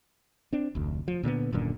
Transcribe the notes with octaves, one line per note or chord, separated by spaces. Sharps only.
C4 D4
F1 D2
F3
A#2 D3 F3 B3
D#1 F#2 A#2 D3